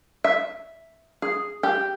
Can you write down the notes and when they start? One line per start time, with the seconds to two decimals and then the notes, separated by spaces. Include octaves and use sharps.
0.24 E5
1.22 G#4
1.63 G4